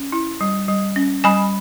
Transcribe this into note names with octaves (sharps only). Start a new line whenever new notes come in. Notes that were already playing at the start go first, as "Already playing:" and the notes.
Already playing: C#4
E4
G3
G3
C#4
G3 G#5 B5